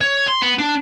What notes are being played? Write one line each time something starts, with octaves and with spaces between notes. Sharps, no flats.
C#5
C6
B3
D4